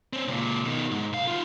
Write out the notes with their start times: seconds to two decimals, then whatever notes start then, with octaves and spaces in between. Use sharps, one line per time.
0.13 C4 C#4
0.28 C#2 A#2
0.66 B2 D#3
0.91 G#2
1.13 B1 F5
1.27 D#4 F4